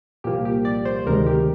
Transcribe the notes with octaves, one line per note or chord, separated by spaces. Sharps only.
C2 A#2 F3 A#3 G4
G4
D5
C5
D2 C3 D#3 G#3 A#4
G4